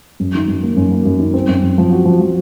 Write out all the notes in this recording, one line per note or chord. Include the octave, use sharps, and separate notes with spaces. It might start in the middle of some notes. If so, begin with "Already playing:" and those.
F#2
D#3
F#2
A#3
F#2
A#3
F#2
D#3
C4
F#2
F#2
F3
F#4
F3
F3